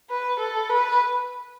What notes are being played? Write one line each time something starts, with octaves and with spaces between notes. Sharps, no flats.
B4
A4
B4